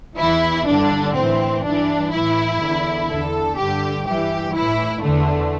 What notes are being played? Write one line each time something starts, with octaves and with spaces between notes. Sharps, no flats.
E2 E3 E4
G2 D3 D4
A2 E3 C4
G2 E3 D4
A2 E3 E4
E2 D3
E2 D3 A4
G2 D3 G4
G2 E3 G4
A2 E3 E4
E2 D3 A3